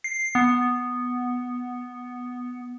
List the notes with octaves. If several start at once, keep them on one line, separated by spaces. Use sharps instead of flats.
C7
B3